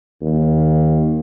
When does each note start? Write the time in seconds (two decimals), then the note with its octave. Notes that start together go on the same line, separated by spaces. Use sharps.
0.22 D#2